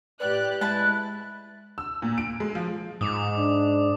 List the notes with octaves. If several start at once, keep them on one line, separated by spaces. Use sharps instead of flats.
A2 G4 B4 D5 F#6
G#3 E4 B4 A5 F#6
E6
A#2
D7
G#3
F3
G#2 D6 D#6
D4